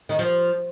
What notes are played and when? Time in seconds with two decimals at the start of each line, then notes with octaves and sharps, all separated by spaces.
0.09 D#3
0.19 F3